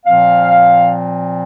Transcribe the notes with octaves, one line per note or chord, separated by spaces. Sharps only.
A#2 F3 C4 F5